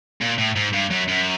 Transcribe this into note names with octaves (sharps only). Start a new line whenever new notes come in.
A#2
A2
G#2
G2
F#2
F#2